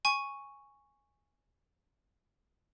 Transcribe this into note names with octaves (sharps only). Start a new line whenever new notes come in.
G#5 C#6